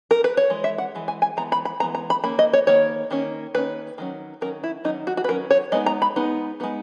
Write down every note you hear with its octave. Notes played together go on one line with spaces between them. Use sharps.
A#4
B4
C#5
E3 G#3
E5
F#5
E3 G#3
G#5
G#5
E3 G#3 B3 A#5
B5
B5
E3 G#3 B3 A#5
A#5
B5
D#3 A#3 C#4 B5
D#5
C#5
D#3 A#3 C#5
D#3 A#3 C#4
D#3 A#3 C#4 B4
D#3 F#3 C#4
D#3 F#3 C#4 A#4
E4
D#3 F#3 C#4 D#4
F#4
F#4
B4
D#3 F#3 C#4 A#4
C#5
G#3 B3 D#4 D#5
A#5
B5
G#3 B3 D#4
G#3 B3 D#4